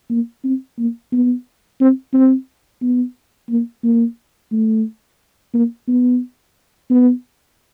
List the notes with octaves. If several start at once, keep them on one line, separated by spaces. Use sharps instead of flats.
A#3
C4
A#3
B3
C4
C4
B3
A#3
A#3
A3
A#3
B3
B3